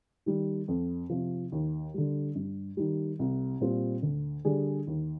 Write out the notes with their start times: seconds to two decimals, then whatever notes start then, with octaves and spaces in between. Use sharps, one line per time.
0.26 D#3 G3
0.68 F2
1.10 C3 F3
1.52 D#2
1.94 D3 G3
2.35 G2
2.77 D#3 G3
3.19 C2
3.60 A#2 G3 C4 F4
4.03 D2
4.45 D3 G3 D4 G#4
4.87 D#2